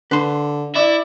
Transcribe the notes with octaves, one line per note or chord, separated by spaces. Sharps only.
D3 B4 C6
E4 D5